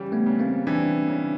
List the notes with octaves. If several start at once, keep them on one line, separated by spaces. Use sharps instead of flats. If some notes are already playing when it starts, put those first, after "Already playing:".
Already playing: C#3 E3 G3
A3 B3
C#3
A#3 C4
E3 C4 D4
C#3